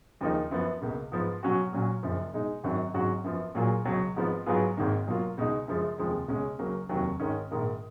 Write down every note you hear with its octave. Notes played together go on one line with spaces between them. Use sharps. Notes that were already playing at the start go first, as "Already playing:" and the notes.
D#2 C#3 F3 A#3 D#4
F#2 F3 B3
C#2 B2 A#3
G#2 F3 B3
B2 F#3 C#4 F#4
A#2 F#3 C#4 F#4
F#1 F#2 F3
B2 G#3 D#4
G#1 F#2 D#3 F#3
G#1 G#2 F#3 C#4 F#4
F#2 F3 B3
A#2 F#3 A#3 F4 G#4
C#2 B2 F#3
G#1 G#2 F3 B3
G#2 F#3 B3 F4 G#4
G#1 G#2 D#3 A#3
B2 F#3 A#3 F4
C#2 B2 G#3 D#4
F#2 C#3 F3 G#3
F1 D#2 C#3 F3 G#3
C#2 B2 G#3 C#4
C#2 C#3 F#3 A#3
F1 D#2 D#3 F#3
G#2 D#3 G#3 C#4
A#1 G#2 D#3 A#3